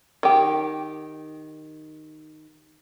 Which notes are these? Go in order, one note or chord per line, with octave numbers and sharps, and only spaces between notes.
D#3 G4